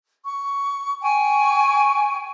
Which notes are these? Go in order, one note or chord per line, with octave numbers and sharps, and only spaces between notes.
C#6
G5 G#5 C#6